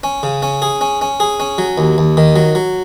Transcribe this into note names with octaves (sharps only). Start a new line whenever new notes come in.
C#4
C#3
C#4
G#4
C#4
C#4
G#4
C#4
F#3
D#2
D#2
D#3
F#3
F#3